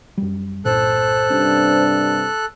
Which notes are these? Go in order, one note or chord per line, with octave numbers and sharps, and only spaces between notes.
F#2 G3
C2 G2 A#2 A4 C5 F#6
G2 C3 C#4 D4